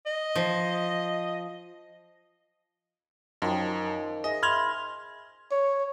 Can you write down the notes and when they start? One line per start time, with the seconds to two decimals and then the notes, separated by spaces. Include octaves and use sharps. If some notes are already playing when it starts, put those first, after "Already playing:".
0.06 D#5
0.35 F3
3.42 F#2 D#3 F3
4.24 G#4 D#5 E5 A#6
4.43 E5 B5 C6 F6 G#6 F7
5.52 C#5